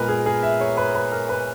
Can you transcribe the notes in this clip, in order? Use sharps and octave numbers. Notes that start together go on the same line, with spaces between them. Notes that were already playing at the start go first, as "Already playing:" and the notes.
Already playing: A#2 G#3 B3 A#4 B4
G#4
G#4
E5
C#5
B4
B4
A#4
B4